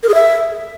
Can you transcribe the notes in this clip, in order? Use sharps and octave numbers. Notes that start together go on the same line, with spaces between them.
A#4
G#4
E5